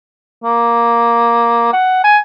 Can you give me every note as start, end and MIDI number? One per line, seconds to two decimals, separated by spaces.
0.44 1.69 58
1.73 2.00 78
2.04 2.18 80